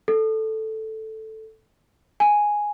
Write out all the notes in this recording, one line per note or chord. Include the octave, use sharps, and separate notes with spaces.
A4
G#5